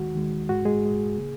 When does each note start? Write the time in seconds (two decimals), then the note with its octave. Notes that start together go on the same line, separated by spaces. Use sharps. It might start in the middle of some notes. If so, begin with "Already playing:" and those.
Already playing: D#2 D#3 G#3 F#4
0.15 D#2 D#3 G#3
0.49 G#2 G#3 F#4
0.65 G#3 G#4
0.83 G#2 G#3
1.17 C#3 A#3